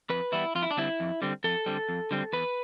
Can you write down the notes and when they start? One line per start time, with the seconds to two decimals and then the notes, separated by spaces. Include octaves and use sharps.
0.10 F2 B4
0.32 E3 G3 B3 E4
0.55 F2 F4
0.63 E4
0.71 D4
0.77 D3 G3 C4 E4
1.00 F2
1.22 D3 G3 C4
1.44 F2 A4
1.66 D3 G3 C4
1.89 F2
2.11 D3 G3 C4
2.33 E2 B4